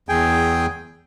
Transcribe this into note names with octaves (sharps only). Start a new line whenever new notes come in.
E2 G#4 G5 G#5